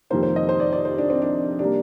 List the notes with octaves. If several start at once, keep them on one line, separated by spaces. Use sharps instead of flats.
F2 C3 D#3 G3 A#3 C5
C5
D#5
C5
D5
D5
C5
D4
C4
D4
C3 G3 A#3 D4